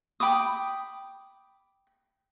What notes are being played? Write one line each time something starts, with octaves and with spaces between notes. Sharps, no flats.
G5 B5 D6 D#6